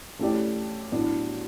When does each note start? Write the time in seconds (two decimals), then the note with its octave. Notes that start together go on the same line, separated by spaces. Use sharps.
0.19 A3 C#4 E4 G4 D5
0.92 A2 F#3 B3 D4